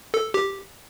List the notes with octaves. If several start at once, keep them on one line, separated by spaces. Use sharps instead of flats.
A4
G4